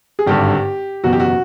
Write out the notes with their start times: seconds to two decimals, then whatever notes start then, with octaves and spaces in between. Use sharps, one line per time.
0.19 G#4
0.26 G#1 G2 D3 G4
1.04 F#1 E2 B2 F#4
1.13 G4
1.20 F#4